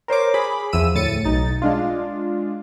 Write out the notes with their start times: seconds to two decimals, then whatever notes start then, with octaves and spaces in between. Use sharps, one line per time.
0.08 A#4 C5 C#5 D6
0.34 G#4 B5
0.73 E2 F3 E6 D#7
0.95 D2 A2 A6 C#7 D#7
1.24 B1 D#4 A6
1.62 G#3 D4 F4